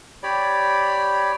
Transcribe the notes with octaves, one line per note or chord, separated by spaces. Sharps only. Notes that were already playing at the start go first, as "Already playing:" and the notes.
G4 C#5 D5 B5